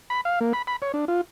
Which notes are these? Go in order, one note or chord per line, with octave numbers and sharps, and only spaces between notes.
B5
F5
A#3
B5
B5
C#5
D4
F4